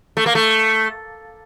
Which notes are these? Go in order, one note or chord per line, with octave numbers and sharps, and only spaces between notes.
A3
A#3
A3